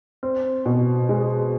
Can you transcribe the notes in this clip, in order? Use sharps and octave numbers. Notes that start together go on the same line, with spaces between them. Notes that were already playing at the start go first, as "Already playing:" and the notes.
C4
B2
G#3